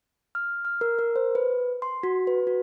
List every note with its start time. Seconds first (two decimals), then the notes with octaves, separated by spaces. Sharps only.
0.35 F6
0.65 F6
0.81 A#4
0.99 A#4
1.16 C5
1.35 B4
1.82 C6
2.03 F#4
2.27 B4
2.47 F#4